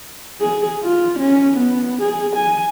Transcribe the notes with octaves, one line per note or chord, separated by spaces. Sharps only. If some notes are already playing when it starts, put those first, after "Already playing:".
G#4
F4
C#4
B3
G#4
G#5